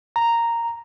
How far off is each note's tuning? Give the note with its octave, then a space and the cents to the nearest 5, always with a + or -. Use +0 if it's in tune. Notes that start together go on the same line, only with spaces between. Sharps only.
A#5 -5